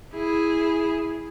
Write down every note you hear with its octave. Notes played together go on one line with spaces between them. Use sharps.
E4 G#4